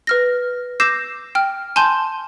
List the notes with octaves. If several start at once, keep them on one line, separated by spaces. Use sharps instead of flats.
B4 F6 A#6
D6 E6 G6 A#6 C7 E7
G5 F6
G#5 A5 C6 G6